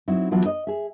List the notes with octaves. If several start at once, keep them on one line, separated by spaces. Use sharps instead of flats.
F#3 C4 D#4 E4
E3 F#3 B3 D4 E4 F4
D#5
G#4 E5